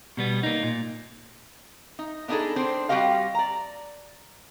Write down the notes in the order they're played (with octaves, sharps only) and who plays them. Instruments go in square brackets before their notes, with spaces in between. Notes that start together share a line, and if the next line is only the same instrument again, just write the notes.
[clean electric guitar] B2 G3 B3
A#3 D#4
A#2
[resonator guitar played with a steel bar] D#4
B3 D4 D#4 F#4 G#4 A4
C4 D4 C5
G3 C4 F#4 G4 D#5 F5
D5 A#5